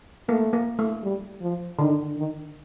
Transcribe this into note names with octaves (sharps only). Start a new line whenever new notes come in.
A3 A#3
A#3
A3
G3
F3
D3 D#3
D#3